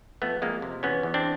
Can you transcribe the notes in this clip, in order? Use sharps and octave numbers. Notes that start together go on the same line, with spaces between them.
F2 A3 B3
F2 G#3 A#3
C3
E2 B3 C#4
E2
C4 D4